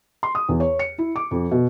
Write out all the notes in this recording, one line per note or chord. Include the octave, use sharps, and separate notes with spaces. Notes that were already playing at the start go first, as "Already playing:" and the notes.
C6
D#6
E2
C#5
C#7
E4
D6
F2
B2